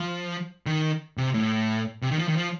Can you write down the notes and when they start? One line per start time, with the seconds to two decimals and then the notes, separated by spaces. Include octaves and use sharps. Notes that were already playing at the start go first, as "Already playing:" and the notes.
Already playing: F3
0.66 D#3
1.17 C3
1.34 A2
2.02 C3
2.11 D#3
2.19 F3
2.28 D#3
2.36 F3